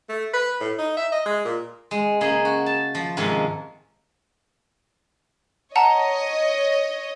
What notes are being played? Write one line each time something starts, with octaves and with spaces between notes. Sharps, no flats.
A3
B4
A2
D#4
E5
D#5
G#3
A#2
G#3
C#3 G#3 A#3 G#4
F#4
A5
F3
G#2 C3 D#3 F3
C#5 D#5 F#5 A5 A#5